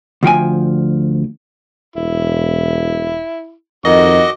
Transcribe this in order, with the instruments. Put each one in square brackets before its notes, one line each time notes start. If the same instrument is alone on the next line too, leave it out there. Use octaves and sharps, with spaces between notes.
[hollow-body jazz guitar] D2 F3 G5 G#5
[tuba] E1 [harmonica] E4
[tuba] F2 [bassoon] D#3 [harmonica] F#4 D6 [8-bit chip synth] D#5